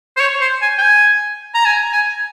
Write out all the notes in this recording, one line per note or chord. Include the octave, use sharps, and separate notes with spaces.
C5
C#5
C5
G#5
G5
G#5
A#5
G#5
G#5